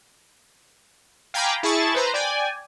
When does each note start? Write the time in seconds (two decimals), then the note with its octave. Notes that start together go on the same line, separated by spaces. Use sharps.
1.34 F5 G5 G#5 A#5 B5 D6
1.63 E4 G#4 A5 C#6 A6
1.94 B4 C5 A#5
2.14 D5 G5 G#5